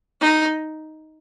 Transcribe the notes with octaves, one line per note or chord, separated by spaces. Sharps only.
D#4